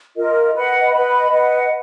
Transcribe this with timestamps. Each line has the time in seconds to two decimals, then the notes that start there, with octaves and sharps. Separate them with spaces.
0.16 F4 A#4 D#5
0.54 B4 D#5 F#5 B5
0.92 B4 D#5 F#5 B5
1.31 B4 D#5 F#5